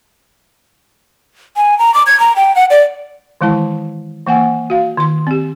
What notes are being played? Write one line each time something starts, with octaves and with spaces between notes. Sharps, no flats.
G#5
A#5
D6
G#6
A#5
G5
F#5
D5
D#3 E3 G#3 E4 A5
E3 A#3 F#5 G#5
F#4 F5
D#3 C6
C4 G4